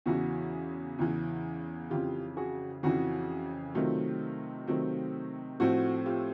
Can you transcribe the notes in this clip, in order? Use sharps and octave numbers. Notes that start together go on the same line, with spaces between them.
E2 C#3 E3 F#4
E2 C#3 E3
F2 C#3 E3 F4 G4
F#4 G#4
F2 C#3 E3 F#4
C3 D#3 F#3 A3 C4 F4
C3 D#3 F#3 A3 C4
A2 F3 A3 C4 F#4
F4 G4